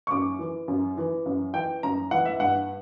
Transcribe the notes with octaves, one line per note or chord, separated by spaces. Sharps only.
C#6
F#2 D6
E3
F#2
E3
F#2
E3 G5
F#2 A#5
E3 F#5
E5
G2 F#5